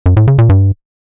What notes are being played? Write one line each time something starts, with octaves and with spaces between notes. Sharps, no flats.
F#2
A2
C#3
A#2
G2